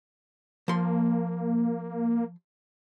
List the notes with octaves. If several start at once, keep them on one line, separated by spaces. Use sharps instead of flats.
F3 A#3 C6